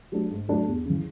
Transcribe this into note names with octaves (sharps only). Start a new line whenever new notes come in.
F#3 A3 D4
G#2
F#3 A3 D4
E2
C#3 E3